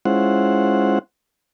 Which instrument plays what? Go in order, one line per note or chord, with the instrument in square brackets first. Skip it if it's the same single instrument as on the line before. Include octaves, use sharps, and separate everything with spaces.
[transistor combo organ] G#3 C#4 E4 F4 C5 F#5